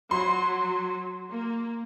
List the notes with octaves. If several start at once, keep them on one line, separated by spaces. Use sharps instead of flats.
F#3 C6
A#3